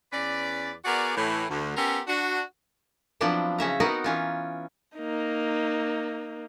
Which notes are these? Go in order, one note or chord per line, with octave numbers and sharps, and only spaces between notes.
E2 C#4 B4 D5
B3 F#4 G#4 A#4 D5
A2 E3
D2
B3 C#4 F4 G4 A4 A#4
D4 F#4
F3 F#3 B3 C4 D4 E4
C#3 C#4 E5 A#5
B3 C4 D#4 F#4 A#4
E3 C#4 F4
A#3 D#4